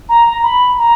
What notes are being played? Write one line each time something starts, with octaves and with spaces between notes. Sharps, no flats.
A#5
B5
A#5